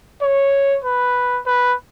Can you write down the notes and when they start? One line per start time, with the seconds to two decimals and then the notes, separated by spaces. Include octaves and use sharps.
0.22 C#5
0.84 B4
1.46 B4